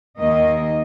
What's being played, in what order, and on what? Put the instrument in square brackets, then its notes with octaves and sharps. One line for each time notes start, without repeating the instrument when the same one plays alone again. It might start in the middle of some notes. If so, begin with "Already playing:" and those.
[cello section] D#2 D#3 A#3 D#5